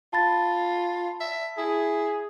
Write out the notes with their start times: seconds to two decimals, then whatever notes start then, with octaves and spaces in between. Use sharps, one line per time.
0.13 F4 A5 B5 A6
1.20 E5
1.58 E4 G#4